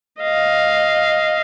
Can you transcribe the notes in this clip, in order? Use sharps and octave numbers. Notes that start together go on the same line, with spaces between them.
D#5 F5